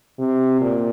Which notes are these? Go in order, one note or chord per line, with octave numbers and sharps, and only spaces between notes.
C3
A#2